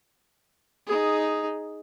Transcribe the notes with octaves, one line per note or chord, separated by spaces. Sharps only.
D#4 G#4